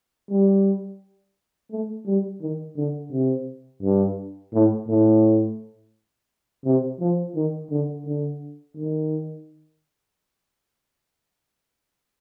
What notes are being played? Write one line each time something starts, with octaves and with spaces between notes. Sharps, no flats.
G3
A3
G3
D#3
D3
C3
G2
A2
A2
C3
F3
D#3
D3
D3
D#3